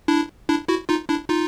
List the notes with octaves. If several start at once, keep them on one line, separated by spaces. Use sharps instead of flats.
D4 E4
D4 E4
E4 F#4
D#4 F4
D4 E4
D#4 F4